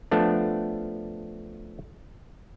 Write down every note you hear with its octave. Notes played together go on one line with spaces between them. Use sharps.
F3 A3 B3 D4